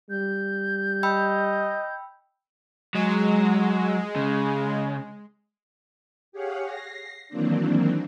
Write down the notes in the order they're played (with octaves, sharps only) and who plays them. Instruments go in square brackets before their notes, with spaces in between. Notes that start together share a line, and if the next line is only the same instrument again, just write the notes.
[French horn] G3 [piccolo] G6
[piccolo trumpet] D#5 [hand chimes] G5 B5 E6
[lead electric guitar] F#3 [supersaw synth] G#3
[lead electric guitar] C#3
[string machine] G4 G#4 C#5 F5 F#5
A#6 C7
D#3 E3 F#3 A#3 C4 D4